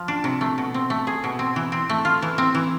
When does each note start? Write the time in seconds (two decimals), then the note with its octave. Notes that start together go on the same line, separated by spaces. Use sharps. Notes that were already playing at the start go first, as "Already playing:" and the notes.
Already playing: F3
0.08 D4
0.24 C3
0.41 A3
0.58 B2
0.74 C4
0.90 A3
1.07 G#4
1.24 B2
1.39 C4
1.56 E3
1.72 C4
1.89 A3
2.05 F4
2.22 E3
2.38 C4
2.55 E3